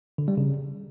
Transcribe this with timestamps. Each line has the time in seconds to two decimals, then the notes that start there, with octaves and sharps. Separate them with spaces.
0.18 D3
0.28 G3
0.38 C#3